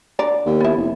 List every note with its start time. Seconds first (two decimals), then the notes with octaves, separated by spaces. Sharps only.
0.19 D3 D5 A#5
0.45 D#2
0.61 B3 E4
0.76 F1